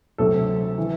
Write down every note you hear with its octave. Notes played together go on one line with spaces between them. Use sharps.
D2 C3 F#3 A4
E3